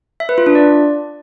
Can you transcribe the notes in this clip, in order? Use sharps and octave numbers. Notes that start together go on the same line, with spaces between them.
E5
B4
F4
D4
D5